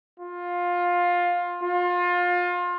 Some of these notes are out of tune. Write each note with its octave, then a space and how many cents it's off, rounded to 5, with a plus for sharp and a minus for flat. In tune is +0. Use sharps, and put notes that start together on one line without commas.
F4 +15
F4 +25